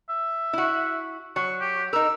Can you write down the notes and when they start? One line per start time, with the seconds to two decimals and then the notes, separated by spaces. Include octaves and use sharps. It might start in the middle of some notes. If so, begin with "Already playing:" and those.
0.09 E5
0.53 E4 F#4
1.36 F#3 C#6
1.61 G4
1.93 D#4 A#4 E6